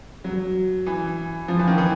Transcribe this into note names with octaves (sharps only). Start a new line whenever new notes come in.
F#3
E3
F3
E3
D#3
E3